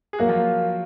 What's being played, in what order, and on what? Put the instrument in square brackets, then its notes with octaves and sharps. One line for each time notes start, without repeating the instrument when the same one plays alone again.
[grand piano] G#4
[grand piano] F#3 F#4 [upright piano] A#3
[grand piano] F3 F4